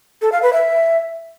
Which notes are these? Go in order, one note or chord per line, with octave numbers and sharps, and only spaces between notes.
A4
F5
B4
E5